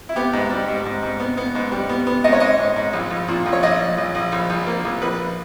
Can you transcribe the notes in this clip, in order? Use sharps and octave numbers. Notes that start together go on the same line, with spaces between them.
E4
B3 G4
G#2
G3
G#2
G#2
G#2
B3
B3
G#2
G3
B3
B3
G#2 D#5
C#5
G#2 D#5
G#2
G#2
A#1
A#1
A#2
A#1
C#5
A#1 D#5
A#1
A#1
A#1
A#1
A#1
A#3
A#1
A#1 B4